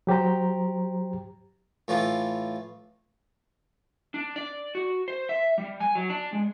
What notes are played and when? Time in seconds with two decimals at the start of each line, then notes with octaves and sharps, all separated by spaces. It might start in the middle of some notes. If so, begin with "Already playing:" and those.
0.07 F#3 G4 C5 A#5
1.88 A2 E3 F4
4.14 D4
4.36 D5
4.75 F#4
5.08 C5
5.29 E5
5.58 G3
5.80 G#5
5.95 F#3
6.10 D4
6.32 G#3